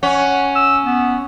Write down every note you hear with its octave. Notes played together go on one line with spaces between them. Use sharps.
C#4 F#5
E6
B3